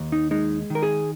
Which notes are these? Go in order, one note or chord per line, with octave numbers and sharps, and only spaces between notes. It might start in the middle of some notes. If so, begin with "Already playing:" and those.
Already playing: D#2
D#4
G#3 D#4
D#3 A#4
G#4